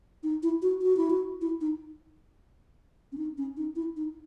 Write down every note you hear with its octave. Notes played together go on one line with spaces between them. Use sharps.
D#4
E4
F#4
F#4
E4
F#4
E4
D#4
C#4
D#4
C#4
D#4
E4
D#4